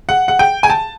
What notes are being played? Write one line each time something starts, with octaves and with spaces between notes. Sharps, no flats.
F#5
F#5
G5
G#5
A5